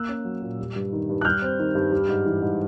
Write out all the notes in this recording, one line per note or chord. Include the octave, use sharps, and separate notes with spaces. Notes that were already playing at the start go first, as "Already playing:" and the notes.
Already playing: A#3 E6 F#6
C#4
F#3
A#2
G3
G2
D#3
G2
F#6
G3 F6 G6
C4
D#3
G2
G3
G#2
E3
G#2